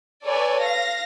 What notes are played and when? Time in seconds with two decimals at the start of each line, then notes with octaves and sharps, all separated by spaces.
0.25 A4 B4 C#5 D5 G#5
0.60 F5 A#6